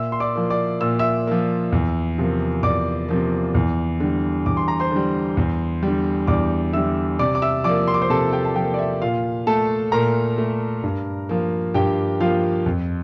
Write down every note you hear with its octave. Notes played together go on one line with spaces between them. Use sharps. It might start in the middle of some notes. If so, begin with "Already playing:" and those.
Already playing: A#2 E5 E6
C6
D5 D6
F3 A#3
D5 D6
A#2 E6
E5 E6
F3 A#3
E2
C3 F3 A#3
E2 D5 D6
C3 F3 A#3
E2
D3 G3
E2 D6
C6
A#5
C5 C6
D3 G3
E2
D3 G3
E2 D5 D6
D3 G3 E5 E6
C3 D5 D6
D6
E5 E6
F3 A#3 D5 D6
C6
D6
C5 C6
C3 A4 A5
G4 G5
A5
F3 A#3 G4 G5
D5
E5
A#2 F4 F5
A3 A4 A5
A#2 A#4 A#5
A3
G2
F3 A#3
G2 G4 G5
F3 A#3 F4 F5
F2